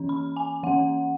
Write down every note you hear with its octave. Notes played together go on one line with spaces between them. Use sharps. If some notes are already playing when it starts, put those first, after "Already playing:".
Already playing: E3 C#4
B5
G#5
E3 C#4 F#5